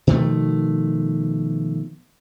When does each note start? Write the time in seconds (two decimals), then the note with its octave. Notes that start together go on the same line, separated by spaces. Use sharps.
0.07 B2 D#3 F3 A3